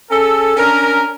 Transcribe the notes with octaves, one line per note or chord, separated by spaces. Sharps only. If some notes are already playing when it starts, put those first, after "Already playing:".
C#4 G#4 A4
C#4 D4 A#4